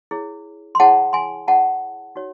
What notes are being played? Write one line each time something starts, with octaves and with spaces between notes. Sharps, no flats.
E4 G#4 C#5
C6
E4 G#4 C#5 F#5 A5
G#5 C6
E4 G#4 C#5 F#5 A5
D#4 F#4 C#5